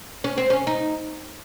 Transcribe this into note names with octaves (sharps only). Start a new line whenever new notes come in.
C#4
C4
C#4
D#4